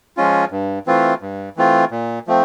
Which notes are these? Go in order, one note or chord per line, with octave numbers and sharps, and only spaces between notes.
F3 G#3 C#4 F4
G2
E3 A3 C4 F4
G2
E3 A3 C4 F4
A#2
F3 A3 C4